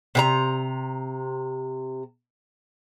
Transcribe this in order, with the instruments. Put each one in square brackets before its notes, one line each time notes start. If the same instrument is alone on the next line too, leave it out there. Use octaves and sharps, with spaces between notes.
[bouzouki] C3 G4 A#5